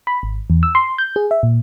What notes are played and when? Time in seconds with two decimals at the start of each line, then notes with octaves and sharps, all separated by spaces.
0.07 B5
0.23 G#1
0.50 E2
0.63 E6
0.75 C6
0.98 G6
1.16 G#4
1.31 E5
1.43 A#2